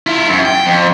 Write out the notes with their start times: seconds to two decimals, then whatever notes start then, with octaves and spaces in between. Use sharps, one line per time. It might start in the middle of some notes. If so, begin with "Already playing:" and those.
0.07 E4 F4
0.30 F#2
0.45 G5
0.66 F2